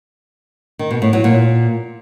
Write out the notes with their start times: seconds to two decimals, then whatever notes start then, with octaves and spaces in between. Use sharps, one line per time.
0.79 D#3
0.91 B2
1.02 A2
1.13 F#3
1.24 A#2